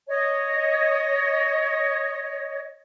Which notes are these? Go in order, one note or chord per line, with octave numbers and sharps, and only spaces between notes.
C#5 D#5